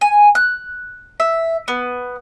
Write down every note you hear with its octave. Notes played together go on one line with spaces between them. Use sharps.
G#5
F#6
E5
B3